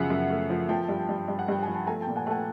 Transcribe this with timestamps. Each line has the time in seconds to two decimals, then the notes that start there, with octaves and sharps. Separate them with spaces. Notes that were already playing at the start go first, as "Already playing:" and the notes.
Already playing: F#2 C#3 F3 E5 F#5
0.10 F#2
0.30 A3
0.50 F3
0.69 F3 G5 A5
0.89 G2
1.09 G2
1.28 G2
1.39 F#5
1.48 G2 G5
1.63 F3 G#5
1.75 A5
1.87 A3 G#5 A#5
2.01 G5 A5
2.07 A#2
2.16 F#5 G#5
2.27 A3 A5
2.31 F#5 G#5